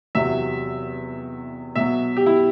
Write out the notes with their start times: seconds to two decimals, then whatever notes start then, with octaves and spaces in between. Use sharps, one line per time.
0.15 E2 C3 F#3 E5
1.75 B2 F#3 E5
2.17 G4
2.26 E4